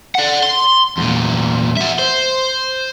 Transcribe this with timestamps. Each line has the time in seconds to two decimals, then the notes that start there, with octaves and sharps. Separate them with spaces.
0.15 D5 F#5
0.43 C6
0.98 E2 A#2
1.77 F#4 E5
1.99 C5